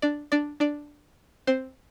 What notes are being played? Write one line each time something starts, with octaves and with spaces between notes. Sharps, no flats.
D4 D5
D4 D5
D4 D5
C4 C5